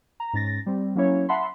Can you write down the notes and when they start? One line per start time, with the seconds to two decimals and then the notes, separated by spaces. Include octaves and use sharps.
0.20 A#5
0.33 G#2 C#4 A6 A#6
0.66 G3 C4
0.95 F#3 A#3 C#4 E4 C#5
1.29 E5 F#5 A5 B5 C6